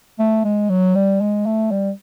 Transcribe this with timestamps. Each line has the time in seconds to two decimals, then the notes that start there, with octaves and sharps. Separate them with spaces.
0.19 A3
0.44 G#3
0.70 F#3
0.95 G3
1.21 G#3
1.46 A3
1.71 G3